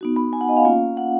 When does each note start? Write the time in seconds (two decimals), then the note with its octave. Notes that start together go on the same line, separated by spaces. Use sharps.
0.01 B3 D#4 F#4
0.16 B5
0.33 G#5
0.41 F#5
0.49 D#5
0.57 F5
0.65 A#3 C#4 F4
0.97 F#5